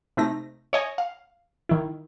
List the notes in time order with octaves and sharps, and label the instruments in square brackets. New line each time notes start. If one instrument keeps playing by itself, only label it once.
[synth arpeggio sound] C3 A3 D#4 A#6
C#5 D#5 G#5
F5
D#3 E4